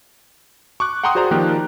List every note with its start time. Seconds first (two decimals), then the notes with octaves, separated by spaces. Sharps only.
0.80 C#6 D6 F#6
1.04 F#5 G5 A#5 C6 C#6 D#6
1.15 F#4 G#4 C5 D5 A#5
1.31 D#3 F3 A#3 G4 A#4 F#6